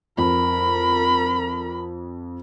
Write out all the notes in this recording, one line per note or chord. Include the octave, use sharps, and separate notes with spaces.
F2 A#4 B5